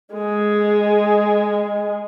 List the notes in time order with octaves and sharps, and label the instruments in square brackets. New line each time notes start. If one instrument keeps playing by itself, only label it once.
[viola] G#3 G#4